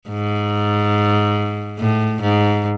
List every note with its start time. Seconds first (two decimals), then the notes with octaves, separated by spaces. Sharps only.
0.09 G#2
1.79 A2
2.21 G#2